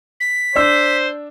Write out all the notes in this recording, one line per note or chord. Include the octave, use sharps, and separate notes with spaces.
B6
D4 C5 E6